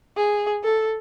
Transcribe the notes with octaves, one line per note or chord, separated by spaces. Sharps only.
G#4
A4